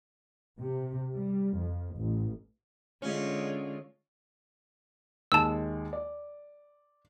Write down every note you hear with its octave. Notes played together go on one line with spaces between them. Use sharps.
C3
G3
F2
A1
D3 G#3 C#4 F4
D#2 G#3 G#5 A5 E6
D5